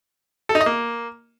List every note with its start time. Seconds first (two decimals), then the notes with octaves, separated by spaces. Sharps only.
0.49 A4
0.55 D#4
0.61 D#5
0.66 A#3